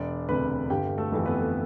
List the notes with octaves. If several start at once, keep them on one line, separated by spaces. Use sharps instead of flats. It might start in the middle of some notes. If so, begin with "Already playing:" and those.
Already playing: E1 D5 D6
D2 C3 B4 B5
G1 G4 G5
A3 A4
F2 E3 A3
B3 B4